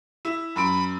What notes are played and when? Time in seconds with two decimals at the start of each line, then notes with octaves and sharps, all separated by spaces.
0.25 E4
0.56 F#2 B5 C6 D7